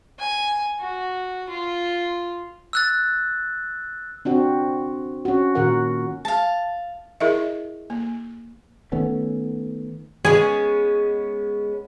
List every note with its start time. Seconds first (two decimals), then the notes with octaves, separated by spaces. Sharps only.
0.19 G#5
0.80 F#4
1.49 F4
2.73 E6 F#6 A6
4.25 C4 D4 F#4
5.25 C#4 F#4
5.55 A#2 D#3 F#4 A#4 F#5
6.25 F5 A5
7.20 E4 G#4 A#4 D#5 E5
7.90 A#3
8.92 D#3 A3 B3 C#4
10.25 G#3 B3 C#4 G#4